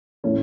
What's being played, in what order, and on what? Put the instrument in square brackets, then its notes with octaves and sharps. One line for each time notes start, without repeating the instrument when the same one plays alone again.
[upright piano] A2 E3 A3 C#4